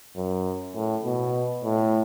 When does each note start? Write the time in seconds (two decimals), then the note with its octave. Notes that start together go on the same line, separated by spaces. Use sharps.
0.16 F#2
0.75 A2
1.05 B2
1.64 A2